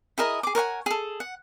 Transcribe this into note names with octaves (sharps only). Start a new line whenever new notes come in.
E4 G#4 A#4 D#5
G#4 D6
A#4 C#5 F#5 G#5
G#4 A4
F#5